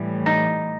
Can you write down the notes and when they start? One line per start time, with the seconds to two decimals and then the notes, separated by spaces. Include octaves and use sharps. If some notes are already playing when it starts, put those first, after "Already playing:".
Already playing: A2 E3 G3
0.26 D#4